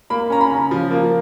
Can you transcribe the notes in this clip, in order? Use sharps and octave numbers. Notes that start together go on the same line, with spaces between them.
A#3 B5
C#4 A#5
B5
C#3
F3
A#3